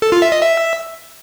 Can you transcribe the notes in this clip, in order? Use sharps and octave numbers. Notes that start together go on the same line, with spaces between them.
A4
F4
E5
D#5
E5